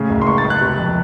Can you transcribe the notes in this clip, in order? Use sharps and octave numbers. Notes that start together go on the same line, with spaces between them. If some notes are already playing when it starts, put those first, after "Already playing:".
Already playing: A2 C#3
F#1
C6
C#2 C#6
A6
C#2
F#6
C3
F2